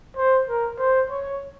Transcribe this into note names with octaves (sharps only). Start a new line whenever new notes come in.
C5
A#4
C5
C#5